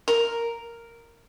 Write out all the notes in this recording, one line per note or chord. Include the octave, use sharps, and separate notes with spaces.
A#4